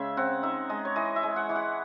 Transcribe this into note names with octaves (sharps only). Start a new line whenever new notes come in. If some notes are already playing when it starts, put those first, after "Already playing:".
Already playing: C#3 G#3 E5
C4 F#5
D#4 E5
G#3 D#5
C#5
E3 D#5
E5
G#3
F#5
E3
F#5